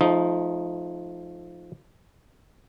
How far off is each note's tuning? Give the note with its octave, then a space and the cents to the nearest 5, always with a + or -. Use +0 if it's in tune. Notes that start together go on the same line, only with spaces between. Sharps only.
F3 +0 A3 -35 D#4 +0